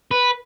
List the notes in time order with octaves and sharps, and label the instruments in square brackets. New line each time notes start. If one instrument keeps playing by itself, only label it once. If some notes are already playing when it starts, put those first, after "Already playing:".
[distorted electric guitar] B4